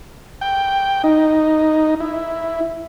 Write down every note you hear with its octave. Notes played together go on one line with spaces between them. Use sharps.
G5
D#4
E4